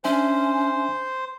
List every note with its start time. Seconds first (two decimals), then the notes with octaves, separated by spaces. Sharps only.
0.04 C#4 D4 C5 E5 G#5